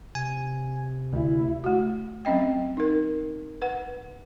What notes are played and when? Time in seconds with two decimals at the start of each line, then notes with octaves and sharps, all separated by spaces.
0.15 C3 G#5
1.13 D2 E4
1.64 A3 F#4
2.25 F#3 C4 C#4 D#5 G5
2.77 D#4 A#4
3.62 B4 F#5